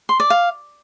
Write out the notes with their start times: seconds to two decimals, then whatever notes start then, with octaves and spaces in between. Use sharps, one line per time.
0.09 C6
0.20 D5
0.30 F5